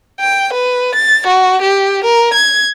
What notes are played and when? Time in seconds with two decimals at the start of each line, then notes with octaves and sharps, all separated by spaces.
0.20 G5
0.53 B4
0.95 A6
1.27 F#4
1.62 G4
2.05 A#4
2.34 G#6